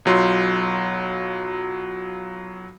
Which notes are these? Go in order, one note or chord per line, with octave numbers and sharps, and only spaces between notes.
B1 F#3 F4 C6